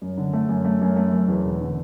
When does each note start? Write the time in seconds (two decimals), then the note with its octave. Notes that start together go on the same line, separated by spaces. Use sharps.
0.02 F#2
0.17 D3
0.33 A3
0.49 F#2
0.65 A3
0.81 F#2
0.96 A3
1.12 F#2
1.28 E2
1.44 E1
1.60 D3